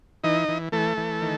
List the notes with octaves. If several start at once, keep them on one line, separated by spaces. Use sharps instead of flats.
E3 D#4 D#5
E3
E3 A3 A4
E3
D#3